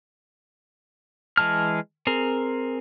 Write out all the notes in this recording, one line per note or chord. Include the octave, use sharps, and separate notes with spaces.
E3 G#3 A5 F6
C4 G#4 A#4